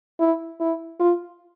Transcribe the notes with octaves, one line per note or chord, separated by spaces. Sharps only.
E4
E4
F4